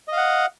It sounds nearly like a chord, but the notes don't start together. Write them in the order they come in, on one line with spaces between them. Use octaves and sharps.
D#5 F5 F#5